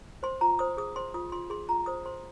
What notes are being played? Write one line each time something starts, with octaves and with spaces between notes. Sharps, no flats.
C5 C6
F4 A#5
C5 D#6
G#4 D#6
C5 C6
F4 D#6
F4 C6
G#4 C6
F4 A#5
C5 D#6
C5 C6